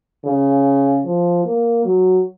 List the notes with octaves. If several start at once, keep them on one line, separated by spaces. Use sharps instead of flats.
C#3
F3
A#3
F#3